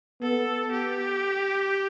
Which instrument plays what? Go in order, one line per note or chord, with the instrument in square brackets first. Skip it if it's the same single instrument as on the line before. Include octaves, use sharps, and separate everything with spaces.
[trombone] B3 [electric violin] A4
[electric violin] G4